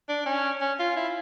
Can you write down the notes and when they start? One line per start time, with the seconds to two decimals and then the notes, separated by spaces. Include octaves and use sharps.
0.09 D4
0.26 C#4
0.61 C#4
0.79 F4
0.96 E4